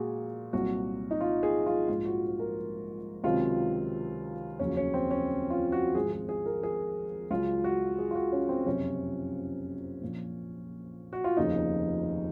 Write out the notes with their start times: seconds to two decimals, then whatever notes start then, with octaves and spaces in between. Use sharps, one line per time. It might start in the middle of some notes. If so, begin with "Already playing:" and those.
Already playing: A#2 G#3 F#4 G#4
0.53 C2 A#2 F#3 F#4
1.11 D#4
1.21 F4
1.43 G#4
1.66 F4
1.89 A#1 G#2 F3 G#3 F4
2.05 F#4
2.39 A#4
3.24 C#2 C3 D#3 F#3 F4
4.59 F1 D#2 C#3 F#3 C#4
4.77 C#4
4.94 C4
5.11 C#4
5.50 F4
5.72 F#4
5.95 G#1 G#2 F3 G#3 G#4
6.13 G#4
6.29 G#4
6.46 A#4
6.63 G#4
7.31 C#2 C#3 F#3 F4
7.64 F#4
7.98 G#4
8.11 F4
8.15 F#4
8.32 C#4
8.49 C4
8.66 F#1 F2 C3 C#4
10.01 A#1 A#2 F3
11.13 F#4
11.24 F4
11.37 F1 D#2 C#3 F3 D#4